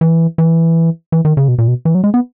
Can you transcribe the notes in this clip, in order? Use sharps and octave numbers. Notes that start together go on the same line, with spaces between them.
E3
E3
E3
D#3
C#3
B2
A#2
B2
E3
F#3
G#3
B3